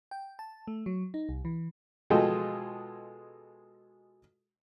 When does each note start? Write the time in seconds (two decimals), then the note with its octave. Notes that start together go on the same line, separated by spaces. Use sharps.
0.11 G5
0.39 A5
0.67 A3
0.86 F#3
1.14 D#4
1.29 C2
1.45 E3
2.10 B2 G#3 F4 G#4 A4 G5